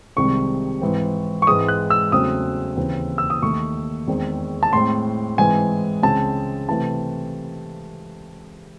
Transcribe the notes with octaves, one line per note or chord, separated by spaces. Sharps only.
C2 C3 D#3 G#3 C4 C#6
G#2 E3 C4
C#6
G#2 E3 G#3 C4 D#6
F#6
E6
E2 C#3 F#3 A3 C4 D#6
D#2 C#3 E3 C4
E6
D#6
D#2 D#3 A3 C#6
E2 D#3 G#3 C4
A5
A2 G#3 C4 C6
G#2 E3 G#3 C4 G#5
C#2 C#3 G#3 C4 A5
C3 E3 A3 C4 A5